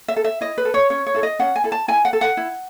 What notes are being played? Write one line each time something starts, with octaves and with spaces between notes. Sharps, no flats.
E5
A4
E5
E4 D#5
B4
A4
C#5
C#4 C#5
C#5
E4 A4
D#5
C#4 F#5
G#5
E4 A4
A5
E4 G#5
F#5
A4
F#5
E4